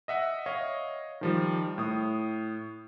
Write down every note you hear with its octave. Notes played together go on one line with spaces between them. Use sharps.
D#5 E5 F#5
C#5 D#5 F5
D#3 F3 G3
A2 D#6